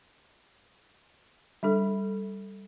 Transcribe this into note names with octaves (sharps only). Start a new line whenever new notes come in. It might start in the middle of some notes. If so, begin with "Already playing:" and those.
G3 D4 A4